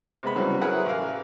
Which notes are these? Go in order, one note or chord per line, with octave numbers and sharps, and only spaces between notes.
C3 G#3 B3 B5
C#3 E3 F#3 G3 C4 F#4
F#3 E4 G#4 A#4 B4 F#5
A1 A#4 F5